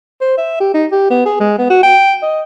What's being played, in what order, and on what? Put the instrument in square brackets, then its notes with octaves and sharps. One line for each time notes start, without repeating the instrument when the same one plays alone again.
[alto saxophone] C5
E5
G4
D#4
G4
B3
G#4
G#3
B3
F#4
G5
D#5